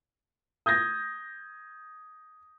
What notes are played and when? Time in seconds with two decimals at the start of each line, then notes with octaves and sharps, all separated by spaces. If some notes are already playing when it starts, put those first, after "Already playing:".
0.66 D#6 G6 G#6 A#6